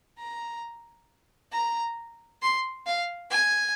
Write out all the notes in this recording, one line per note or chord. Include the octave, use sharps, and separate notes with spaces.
A#5
A#5
C6
F5
G#5